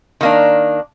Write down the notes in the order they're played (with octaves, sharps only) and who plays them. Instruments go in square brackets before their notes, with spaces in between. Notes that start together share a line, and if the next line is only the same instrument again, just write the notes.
[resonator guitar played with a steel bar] D#3 A#3 D4